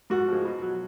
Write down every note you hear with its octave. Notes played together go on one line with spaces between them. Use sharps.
G#2 F#4
F3 G#3
B2
F#3